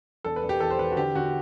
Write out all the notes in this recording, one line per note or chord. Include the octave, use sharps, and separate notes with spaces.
E1 A4
B4
E1
G4
E2 A4
C5
E2 B4
F#4
D3 G4
D3 F#4